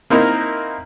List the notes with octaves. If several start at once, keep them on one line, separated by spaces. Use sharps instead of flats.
A#3 C4 D#4 E4 A#4